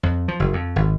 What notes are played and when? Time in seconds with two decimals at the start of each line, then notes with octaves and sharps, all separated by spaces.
0.03 F2
0.28 F3
0.40 F#1
0.53 F2
0.76 G#1